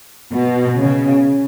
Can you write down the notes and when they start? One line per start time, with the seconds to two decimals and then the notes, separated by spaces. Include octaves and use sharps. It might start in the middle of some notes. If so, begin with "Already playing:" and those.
0.32 B2
0.79 C#3